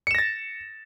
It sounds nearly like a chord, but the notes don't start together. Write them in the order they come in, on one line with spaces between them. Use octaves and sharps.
C#7 E7 A#6 A6